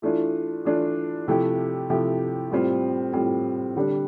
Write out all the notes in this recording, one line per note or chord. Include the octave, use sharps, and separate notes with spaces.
E3 A3 D4 F4
E3 A3 D4 F4
C3 F3 A3 E4 G4
C3 F3 A3 E4 G4
A2 G3 C4 F4
A2 G3 C4 F4
D3 G3 D4 G4